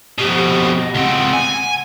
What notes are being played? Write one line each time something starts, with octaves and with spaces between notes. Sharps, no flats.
F2 B2 G4
D#5
C#2 C4 F#5
G#5